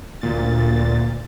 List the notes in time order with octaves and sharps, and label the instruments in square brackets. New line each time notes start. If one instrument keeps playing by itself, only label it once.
[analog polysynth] D2 A#2 A6